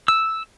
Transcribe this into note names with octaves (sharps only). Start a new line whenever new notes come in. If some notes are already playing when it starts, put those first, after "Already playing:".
E6